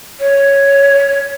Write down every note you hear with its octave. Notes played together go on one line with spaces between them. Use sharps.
C#5